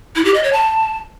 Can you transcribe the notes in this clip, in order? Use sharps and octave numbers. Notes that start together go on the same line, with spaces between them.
E4
G4
D#5
C#5
A5